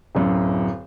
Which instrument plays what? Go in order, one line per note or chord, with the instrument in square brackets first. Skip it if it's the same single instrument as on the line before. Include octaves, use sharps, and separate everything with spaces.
[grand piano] D1 F#2